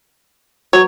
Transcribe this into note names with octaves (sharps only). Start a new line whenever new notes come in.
F#3 C#5